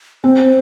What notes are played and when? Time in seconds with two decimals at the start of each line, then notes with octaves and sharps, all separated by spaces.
0.24 C4 C5